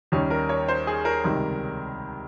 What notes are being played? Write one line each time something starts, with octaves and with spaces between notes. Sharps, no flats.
D#2 D#3 G3 C#4
A#4
C#5
C5
G#4
A#4
C#2 C3 D#3 G3